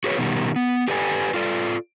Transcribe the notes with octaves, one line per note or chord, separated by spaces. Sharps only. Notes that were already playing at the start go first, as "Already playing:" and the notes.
F#4 G#4 B4 C#5
B2 D#3 G3
B3
G4 A4 B4 D5 G5 G#5
F4 A4 D5